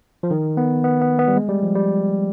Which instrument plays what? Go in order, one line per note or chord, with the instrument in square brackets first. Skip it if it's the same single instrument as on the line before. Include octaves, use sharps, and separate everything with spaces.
[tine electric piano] F3
D#3
B3
B3
B3
B3
G3
G#3
G3
F3
G3